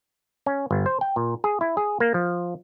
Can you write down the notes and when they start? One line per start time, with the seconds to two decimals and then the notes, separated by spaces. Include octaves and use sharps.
0.46 C#4
0.71 G1
0.86 C5
1.01 G5
1.16 A#2
1.44 G#4
1.61 E4
1.77 G#4
2.00 A#3
2.14 F3